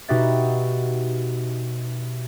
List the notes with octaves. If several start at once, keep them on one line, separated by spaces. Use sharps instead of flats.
B2 D#4 F#4 G4 E5 A6